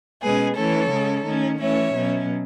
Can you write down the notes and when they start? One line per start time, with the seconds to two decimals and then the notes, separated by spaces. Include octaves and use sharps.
0.22 B2 G#3 C#4 G#4 B4
0.56 E3 A3 C#4 A4 C#5
0.91 C#3 G#3 C#4
1.25 D#3 A3 C#4
1.60 E3 A3 C#4 C#5 E5
1.95 B2 F#3 C#4